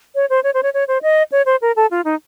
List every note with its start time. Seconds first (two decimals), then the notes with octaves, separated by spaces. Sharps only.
0.15 C#5
0.30 C5
0.44 C#5
0.54 C5
0.63 C#5
0.74 C#5
0.88 C5
1.02 D#5
1.32 C#5
1.46 C5
1.62 A#4
1.76 A4
1.91 F4
2.05 D#4